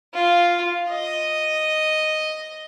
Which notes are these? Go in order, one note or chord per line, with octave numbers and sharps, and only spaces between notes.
F4
D#5